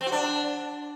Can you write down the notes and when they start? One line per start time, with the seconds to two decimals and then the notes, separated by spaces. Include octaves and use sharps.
0.01 C4
0.06 F#4
0.12 D4